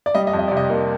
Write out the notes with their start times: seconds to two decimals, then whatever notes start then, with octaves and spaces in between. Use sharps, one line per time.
0.06 D5
0.15 G3 D#5
0.27 D#5
0.33 F2
0.39 D#5
0.48 C3 D5
0.57 D#5
0.70 A#3